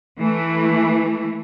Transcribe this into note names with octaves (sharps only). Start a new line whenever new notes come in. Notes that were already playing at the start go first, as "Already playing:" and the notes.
E3 A3